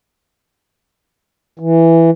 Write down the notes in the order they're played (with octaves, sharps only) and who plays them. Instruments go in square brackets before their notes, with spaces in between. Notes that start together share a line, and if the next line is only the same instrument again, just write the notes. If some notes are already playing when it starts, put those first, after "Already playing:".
[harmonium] E3